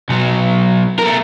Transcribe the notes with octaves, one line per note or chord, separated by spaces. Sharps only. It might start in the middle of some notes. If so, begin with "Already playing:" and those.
B1 F#3
A3 A#4